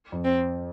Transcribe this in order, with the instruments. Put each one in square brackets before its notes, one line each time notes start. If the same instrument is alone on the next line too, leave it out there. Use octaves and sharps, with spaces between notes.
[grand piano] F2
[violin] C4